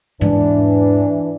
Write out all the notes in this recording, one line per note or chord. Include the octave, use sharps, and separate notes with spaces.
E2 G#2 E3 D4